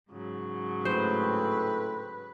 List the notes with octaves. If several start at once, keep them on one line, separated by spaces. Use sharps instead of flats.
G#2 C#3 F#3
A2 A3 C4 B4 C5